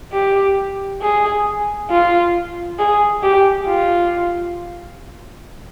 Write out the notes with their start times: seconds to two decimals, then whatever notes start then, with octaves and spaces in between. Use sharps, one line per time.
0.13 G4
1.01 G#4
1.90 F4
2.79 G#4
3.23 G4
3.68 F4